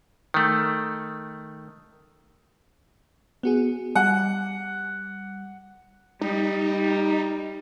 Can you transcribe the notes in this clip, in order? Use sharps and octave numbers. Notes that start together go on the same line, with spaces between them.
D#3 A3
B3 F#4 G#4
G3 F#5
G3 D#4